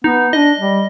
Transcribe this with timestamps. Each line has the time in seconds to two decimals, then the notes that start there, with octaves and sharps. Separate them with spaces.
0.04 B3 D#4
0.33 D4 D#5
0.59 G3